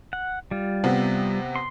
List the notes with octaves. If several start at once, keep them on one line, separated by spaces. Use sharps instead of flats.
F#5
G3 F4
C3 B3 C4
C6